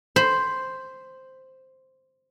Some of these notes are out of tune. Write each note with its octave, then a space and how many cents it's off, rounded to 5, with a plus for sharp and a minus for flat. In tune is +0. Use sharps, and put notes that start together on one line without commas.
C5 +0 B5 +20